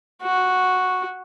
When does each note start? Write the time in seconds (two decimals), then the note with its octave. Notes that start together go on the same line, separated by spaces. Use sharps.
0.23 F#4